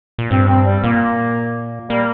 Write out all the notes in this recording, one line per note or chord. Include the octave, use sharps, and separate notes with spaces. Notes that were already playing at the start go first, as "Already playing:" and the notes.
A#2
G2 C4
C4
G3
A#2 A#3
G3 A#3